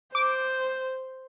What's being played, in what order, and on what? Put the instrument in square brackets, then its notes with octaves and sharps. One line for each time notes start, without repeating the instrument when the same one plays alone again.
[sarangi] C5 [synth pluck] D6